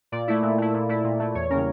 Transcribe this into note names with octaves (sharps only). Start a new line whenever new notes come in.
A#2 D5
A3 E4
A#2
A3 E4
A#2
A3 E4
A#2
A3 E4
E2 C#5
C#3 G3 A#3 C#4 A#4